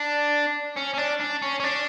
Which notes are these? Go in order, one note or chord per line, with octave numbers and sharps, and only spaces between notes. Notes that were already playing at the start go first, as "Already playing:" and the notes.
Already playing: D4
C#4
C#4
D4
D4
C#4
C#4
D4